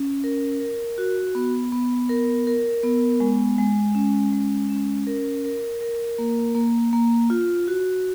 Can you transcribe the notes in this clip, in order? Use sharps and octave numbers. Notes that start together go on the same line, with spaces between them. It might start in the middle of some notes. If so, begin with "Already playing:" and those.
Already playing: C#4
A#4
A#4
F#4
B3
B3
A#4
A#4
B3
G#3
G#3
C#4
G#3
C#4
A#4
A#4
A#4
A#3
A#3
A#3
F4
F#4